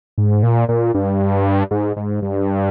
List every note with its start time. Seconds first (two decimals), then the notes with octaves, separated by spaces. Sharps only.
0.18 G#2
0.43 A#2
0.69 A#2
0.94 G2
1.71 G#2
1.97 G#2
2.22 G2